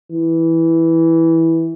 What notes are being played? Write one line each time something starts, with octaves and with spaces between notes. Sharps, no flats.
E3